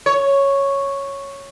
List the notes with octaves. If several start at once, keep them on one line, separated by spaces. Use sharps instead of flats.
C#5